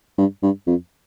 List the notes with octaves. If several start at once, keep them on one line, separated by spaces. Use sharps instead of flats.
G2
G2
F2